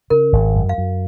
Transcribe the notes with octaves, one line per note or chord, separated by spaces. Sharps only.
C#3 A#4
G#1
F#2
F5
F#2